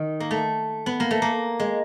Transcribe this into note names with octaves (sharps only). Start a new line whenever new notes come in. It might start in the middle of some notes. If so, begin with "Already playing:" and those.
Already playing: D#3
A#3
A3
B3
A#3
A3
A#3
G#3